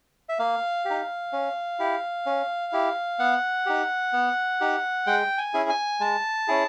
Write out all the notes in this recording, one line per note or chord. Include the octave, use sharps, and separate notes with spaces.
E5
A#3 F5
G4
D#4
C#4
E4 G4
C#4
E4 G4
B3 F#5
D#4 G4
B3
D#4 G4
G#3 G5
G#5
C#4 E4 G#4
G#5
G#3 A5
C#4 E4 G#4